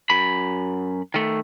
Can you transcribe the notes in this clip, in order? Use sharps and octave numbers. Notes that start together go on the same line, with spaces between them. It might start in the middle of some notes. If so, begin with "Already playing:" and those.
F#2 B5
D#3 A3